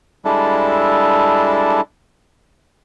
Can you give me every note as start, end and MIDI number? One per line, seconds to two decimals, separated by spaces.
0.25 1.81 55
0.25 1.81 56
0.25 1.81 62
0.25 1.81 64
0.25 1.81 69